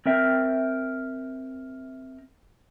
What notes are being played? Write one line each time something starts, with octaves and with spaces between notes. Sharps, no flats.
C4 A#4 E5 G5